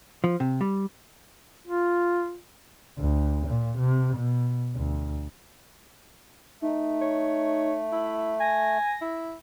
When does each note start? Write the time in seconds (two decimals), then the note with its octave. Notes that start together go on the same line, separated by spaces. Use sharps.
0.24 F3
0.40 C3
0.61 G3
1.65 F4
2.98 D2
3.47 A#2
3.78 C3
4.16 B2
4.75 D2
6.62 A3 D#4
7.02 C#5
7.92 E4
8.40 G#5 A#6
9.01 E4